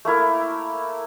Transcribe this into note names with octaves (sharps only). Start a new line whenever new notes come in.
A3 A#3 E4 A#4